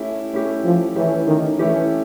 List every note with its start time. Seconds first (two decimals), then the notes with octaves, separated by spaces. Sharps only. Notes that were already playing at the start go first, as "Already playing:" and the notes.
Already playing: A3 C#4 E4 G4
0.33 A3 C#4 E4 G4
0.64 F3
0.96 E3 A3 C#4 E4 G4
1.27 D#3
1.59 E3 A3 C#4 E4 G4